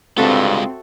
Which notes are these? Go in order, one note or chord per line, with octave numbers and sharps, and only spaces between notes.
G2 G#3 C4 F4 F#4 A4 E5